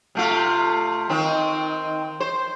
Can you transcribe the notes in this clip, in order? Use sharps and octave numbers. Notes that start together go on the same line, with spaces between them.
C3 A3 F4
D#3 C4
C5